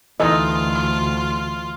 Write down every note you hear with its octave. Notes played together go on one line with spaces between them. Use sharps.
D2 E3 D#4 F4 A4 D#5